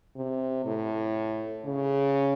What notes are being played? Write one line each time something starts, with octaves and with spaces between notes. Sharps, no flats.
C3
A2
C#3